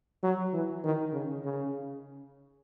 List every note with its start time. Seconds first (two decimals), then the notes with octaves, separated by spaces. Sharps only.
0.23 F#3
0.53 E3
0.84 D#3
1.13 C#3
1.44 C#3